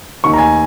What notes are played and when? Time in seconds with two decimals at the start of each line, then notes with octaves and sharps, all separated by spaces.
0.24 D#2 D#3 C#6
0.34 A#5
0.38 G#5